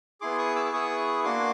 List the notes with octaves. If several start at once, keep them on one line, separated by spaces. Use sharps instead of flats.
B3 E4 G#4 C6 D6
C#6 D#6
D6 E6
E6
B3 E4 G#4 C#6 D#6
A#3 D4 F#4 C6 D6